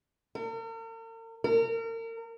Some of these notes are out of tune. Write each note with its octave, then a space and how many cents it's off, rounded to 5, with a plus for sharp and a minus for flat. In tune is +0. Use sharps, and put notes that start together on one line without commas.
A#4 -45
A#4 -35